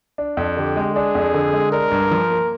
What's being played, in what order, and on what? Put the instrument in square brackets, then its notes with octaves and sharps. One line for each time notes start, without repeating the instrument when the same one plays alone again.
[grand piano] D4
F2
[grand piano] D3 [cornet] G4
[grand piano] G#3
[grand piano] D4 [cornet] G#4
[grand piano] F2
D3
G#3
[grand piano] D4 [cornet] A#4
[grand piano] G2
F3
A#3